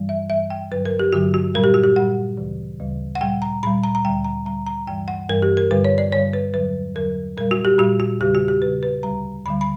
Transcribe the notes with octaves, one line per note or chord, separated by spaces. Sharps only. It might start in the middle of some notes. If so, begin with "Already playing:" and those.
Already playing: G2 E3 G3
E5
G2 E3 G3 E5
G5
G2 D3 F#3 B4
A#4
G4
G2 D3 F#3 F#4
F#4
A#2 G3 A#4
G4
F#4
G4
A#2 G3 F#5
D2 C#3 E3 G3
D2 C#3 E3 G3
F#5
A#2 G3 G5
A#5
A#2 G3 B5
A#5
A#5
D2 D3 G3 G5
A#5
D2 D3 G3 A#5
A#5
G2 E3 G3 G5
F#5
G2 E3 G3 A#4
G4
A#4
G2 D3 G3 B4
C#5
D5
G2 D3 G3 C#5
B4
E2 D3 F#3 B4
E2 D3 F#3 A#4
A#2 G3 A#4
F#4
G4
A#2 G3 F#4
F#4
E2 C#3 G3 G4
F#4
G4
E2 C#3 G3 B4
B4
D2 D3 G3 A#5
D2 D3 G3 B5
B5